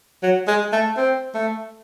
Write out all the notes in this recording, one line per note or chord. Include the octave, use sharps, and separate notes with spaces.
F#3
G#3
A3
C4
A3